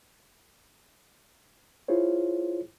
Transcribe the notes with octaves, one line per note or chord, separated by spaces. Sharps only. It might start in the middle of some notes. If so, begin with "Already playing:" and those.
E4 F4 G#4 C5 C#5